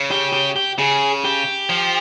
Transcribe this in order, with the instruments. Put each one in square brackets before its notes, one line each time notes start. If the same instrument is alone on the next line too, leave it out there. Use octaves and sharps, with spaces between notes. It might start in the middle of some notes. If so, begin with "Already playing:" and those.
Already playing: [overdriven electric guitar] C#3
[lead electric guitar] G4
G4
G4
[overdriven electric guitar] C#3 [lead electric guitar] G#4
[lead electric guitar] G4
[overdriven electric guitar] F3